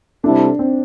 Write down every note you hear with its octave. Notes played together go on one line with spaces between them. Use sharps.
C3 G3 D4 E4 A4
C4